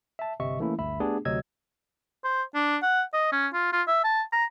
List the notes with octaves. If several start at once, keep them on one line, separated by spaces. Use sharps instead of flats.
E5 A5
G1 C3 D#5 E5 C#6
E3 A3 A#3 C#4 E4
G1 D2 E5 B5
A3 B3 D4 G4 G#4
D2 C3 F#3 D#5 E6 G#6
C5
D4
F#5
D#5
C#4
F4
F4
E5
A5
A#5